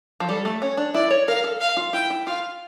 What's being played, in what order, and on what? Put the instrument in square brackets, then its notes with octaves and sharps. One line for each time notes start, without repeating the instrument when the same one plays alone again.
[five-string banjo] F3
[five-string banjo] G3 [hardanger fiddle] A4
[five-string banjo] A3
[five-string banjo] C#4 [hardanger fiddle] C#5
[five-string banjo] D4
[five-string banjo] E4 [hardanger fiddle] D5
[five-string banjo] C#5
[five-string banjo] A#4 [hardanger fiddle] F5
[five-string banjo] A4
[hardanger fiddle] F5
[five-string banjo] F4
[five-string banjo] E4 [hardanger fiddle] G5
[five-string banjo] E4
[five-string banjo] F4 [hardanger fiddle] F5